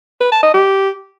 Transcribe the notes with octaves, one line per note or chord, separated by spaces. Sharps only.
B4
A5
D#5
G4